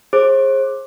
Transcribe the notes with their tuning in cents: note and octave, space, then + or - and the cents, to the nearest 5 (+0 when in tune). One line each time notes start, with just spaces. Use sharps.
G#4 +0 C5 +35 D6 +5